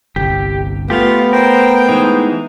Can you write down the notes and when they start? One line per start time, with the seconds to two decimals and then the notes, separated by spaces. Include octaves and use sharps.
0.16 G1 C2 G4
0.90 A3 B3 F4 G4 F5
1.33 A#4 C5 G5
1.89 E3 G#3 D#4